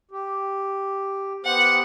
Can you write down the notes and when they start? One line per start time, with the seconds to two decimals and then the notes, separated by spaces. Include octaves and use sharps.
0.11 G4
1.45 B3 G4 C5 F#5